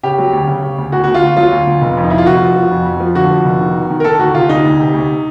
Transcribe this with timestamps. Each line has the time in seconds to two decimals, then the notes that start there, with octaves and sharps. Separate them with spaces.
0.03 C#3 G4
0.18 F#3
0.33 D2
0.47 C#3
0.62 C#3
0.78 D2
0.92 D2 F#4
1.04 D2 F#4
1.14 F4
1.22 D2
1.37 F#3 F4
1.52 D2
1.67 D2
1.82 F1
1.97 F2
2.04 D#4
2.10 F1 E4
2.18 F4
2.26 F1 F#4
2.42 F3
2.56 F3
2.71 F2
2.85 F2
3.00 F3
3.15 D3 F#4
3.30 F3
3.45 F1
3.61 D#3
3.75 D#3
3.90 D#3
4.00 A#4
4.04 D#3 A4
4.19 D2 F#4
4.35 C3 F4
4.49 D2 D#4
4.65 D2
4.80 C3
4.94 D2